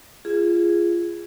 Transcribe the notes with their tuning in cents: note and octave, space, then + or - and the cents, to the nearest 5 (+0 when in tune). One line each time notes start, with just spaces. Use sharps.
F4 -25 G#4 -10